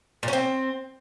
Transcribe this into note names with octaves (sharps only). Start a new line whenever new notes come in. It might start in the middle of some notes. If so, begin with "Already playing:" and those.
A#2
C#4
C4